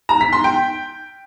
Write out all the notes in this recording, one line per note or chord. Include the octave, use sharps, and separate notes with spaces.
A#5
B6
C6
G5